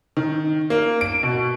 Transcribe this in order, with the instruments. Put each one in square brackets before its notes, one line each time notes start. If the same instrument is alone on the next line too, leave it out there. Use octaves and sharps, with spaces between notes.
[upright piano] D#3
A#3
D7
B2